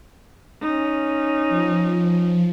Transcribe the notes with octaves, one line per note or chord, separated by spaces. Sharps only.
C#4 D#4
F3